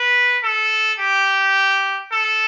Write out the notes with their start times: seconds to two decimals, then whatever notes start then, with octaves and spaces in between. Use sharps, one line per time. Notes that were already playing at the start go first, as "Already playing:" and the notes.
Already playing: B4
0.43 A4
1.00 G4
2.12 A4